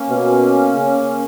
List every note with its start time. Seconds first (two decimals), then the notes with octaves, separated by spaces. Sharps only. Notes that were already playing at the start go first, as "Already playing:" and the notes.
Already playing: A#3 C#4
0.10 B2
0.74 C#3